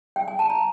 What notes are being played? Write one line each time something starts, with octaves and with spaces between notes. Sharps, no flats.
G5
G#5
A5
A#5